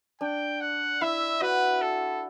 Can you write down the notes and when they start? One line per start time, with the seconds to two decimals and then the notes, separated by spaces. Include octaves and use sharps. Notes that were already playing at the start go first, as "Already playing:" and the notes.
0.21 D4 G5
0.61 F#5
1.01 E4 E5
1.41 F#4 B4
1.81 A4